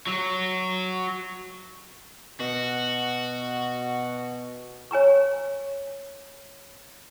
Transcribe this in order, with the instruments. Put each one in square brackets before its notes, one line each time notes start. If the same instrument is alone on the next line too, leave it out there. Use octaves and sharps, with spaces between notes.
[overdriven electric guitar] F#3
[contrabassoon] B2 [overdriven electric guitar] F#4
[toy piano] C#5 G#5 A#5 C#6